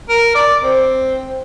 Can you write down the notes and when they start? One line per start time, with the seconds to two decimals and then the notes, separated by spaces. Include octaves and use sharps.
0.09 A#4
0.35 D5
0.63 C4